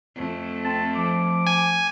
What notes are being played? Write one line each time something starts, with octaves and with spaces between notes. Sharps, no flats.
F2 A3
C4 A5
F3 D6
G#5